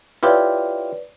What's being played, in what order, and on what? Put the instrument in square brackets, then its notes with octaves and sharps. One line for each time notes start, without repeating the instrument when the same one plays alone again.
[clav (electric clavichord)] E4 F4 G4 [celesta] B4 C#5 D5